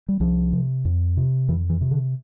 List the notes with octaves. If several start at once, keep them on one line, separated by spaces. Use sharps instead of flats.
G3
C2 F3
C3
F2
C3
F2 E3
E3
C3
D3